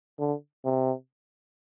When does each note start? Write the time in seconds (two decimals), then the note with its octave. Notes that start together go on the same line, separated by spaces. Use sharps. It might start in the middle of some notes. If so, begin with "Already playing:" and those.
0.19 D3
0.65 C3